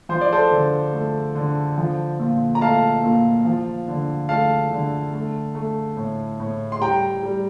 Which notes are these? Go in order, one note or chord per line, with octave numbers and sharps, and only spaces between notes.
F3 C5
D5
A4 C5
D3
A3
D3
F3
A#2
A#5
A3 F5 A5
A#2
F3
D3
A3 F5 A5
D3
A3
A3
A2
A2
C6
G3 G5 A#5
G3